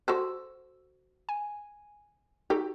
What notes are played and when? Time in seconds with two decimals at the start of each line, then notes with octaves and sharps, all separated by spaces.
0.08 F#4 A4 C5 E6
1.29 G#5
2.50 D#4 F#4 G4 A4